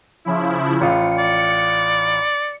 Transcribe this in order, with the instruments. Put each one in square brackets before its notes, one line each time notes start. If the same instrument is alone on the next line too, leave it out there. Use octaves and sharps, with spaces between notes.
[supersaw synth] C#3 F3 E4
[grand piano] A1 F4 [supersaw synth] C#7
[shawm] D5